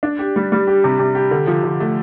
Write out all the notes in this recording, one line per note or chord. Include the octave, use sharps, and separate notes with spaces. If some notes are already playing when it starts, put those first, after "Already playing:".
D4
G4
G3
G3
G4
C3
C3
G4
D3
F3
F3
A3